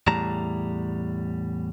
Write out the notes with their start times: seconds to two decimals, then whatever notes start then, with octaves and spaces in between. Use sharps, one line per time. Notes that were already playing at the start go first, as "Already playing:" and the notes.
0.07 E2 A2 G3 A5 A#5